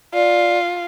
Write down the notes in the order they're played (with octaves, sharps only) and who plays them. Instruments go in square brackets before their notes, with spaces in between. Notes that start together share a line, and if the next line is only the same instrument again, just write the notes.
[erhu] F4 [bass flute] D5